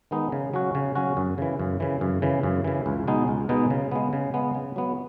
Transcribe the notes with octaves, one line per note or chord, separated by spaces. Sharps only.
D#3 G#3 B3 D#4
C#3
F#3 C#4 F#4
C#3
F#3 C#4 F#4
F#2
C#3 E3
F#2
C#3 E3
F#2
C#3 E3
F#2
C#3 E3
C#2
B2 G#3 B3 D#4
C#2
B2 G#3 B3 D#4
C#3
G#3 B3
C#3
G#3 B3
C#3
F#3 B3